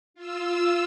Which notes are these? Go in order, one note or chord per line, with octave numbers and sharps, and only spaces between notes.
F4 E6